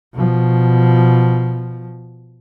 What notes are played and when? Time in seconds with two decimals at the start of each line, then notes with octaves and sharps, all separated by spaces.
0.14 B2 F3